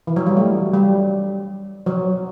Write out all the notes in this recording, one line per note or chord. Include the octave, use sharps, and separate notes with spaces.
E3
F#3
G3
A3
G3
F#3